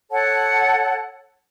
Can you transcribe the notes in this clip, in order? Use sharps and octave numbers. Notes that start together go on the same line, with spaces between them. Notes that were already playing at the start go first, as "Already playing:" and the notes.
A4 C#5 F#5 A5